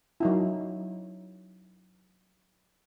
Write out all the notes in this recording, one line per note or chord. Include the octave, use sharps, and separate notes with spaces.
F#3 D#4 E4